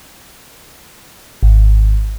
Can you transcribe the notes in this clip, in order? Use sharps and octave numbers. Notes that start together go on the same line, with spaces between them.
G#1